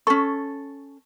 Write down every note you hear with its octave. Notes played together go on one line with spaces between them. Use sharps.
C#4 A4 C#6